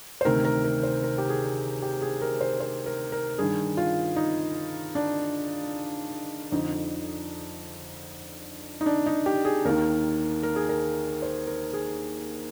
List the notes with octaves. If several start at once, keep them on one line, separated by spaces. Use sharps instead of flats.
C5
D2 C3 D#3 A#4
A#4
A#4
C5
A#4
G4
G#4
G4
G#4
A#4
C5
C5
A#4
A#4
G2 D#3 G#4
F4
D#4
D4
F2 D3 D#4
D#4
D4
D#4
G4
G#4
D#2 D#3 A#4
A#4
G#4
A#4
C5
A#4
G#4